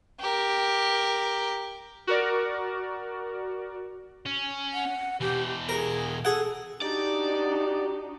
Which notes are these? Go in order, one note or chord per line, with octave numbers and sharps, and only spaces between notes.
G4 A#4
F#4 A#4 D5
C#4
F#5
B2 E3 G4
G#4 A#4
G#4 A4 F#5
D4 D#4 F#4 G4 D5